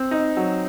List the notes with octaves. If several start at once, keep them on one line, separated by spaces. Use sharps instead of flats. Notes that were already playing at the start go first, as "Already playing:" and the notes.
Already playing: C4
D#4
F#3